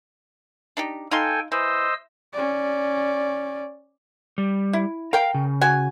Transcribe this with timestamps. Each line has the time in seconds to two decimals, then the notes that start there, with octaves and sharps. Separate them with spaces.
0.77 D4 D#4 G4
1.11 D#4 A4 F5 G5 G#5 C6
1.52 E3 C5 D#5 E6
2.33 C#4 D5
4.38 G3
4.73 E4
5.13 A#4 F5 G5
5.34 C#3
5.61 F#4 G#5